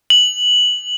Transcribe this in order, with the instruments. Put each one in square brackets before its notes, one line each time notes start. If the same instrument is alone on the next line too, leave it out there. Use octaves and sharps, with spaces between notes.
[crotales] F#7